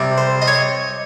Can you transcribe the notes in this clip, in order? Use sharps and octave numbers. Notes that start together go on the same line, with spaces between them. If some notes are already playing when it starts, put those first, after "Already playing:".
Already playing: C3 G3
C5
D#5
C#5